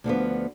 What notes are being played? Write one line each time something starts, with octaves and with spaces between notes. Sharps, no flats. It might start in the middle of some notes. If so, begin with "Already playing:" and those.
D2 D3 F3 B3